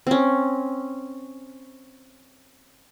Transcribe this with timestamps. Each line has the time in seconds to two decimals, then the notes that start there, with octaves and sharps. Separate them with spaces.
0.07 C4 C#4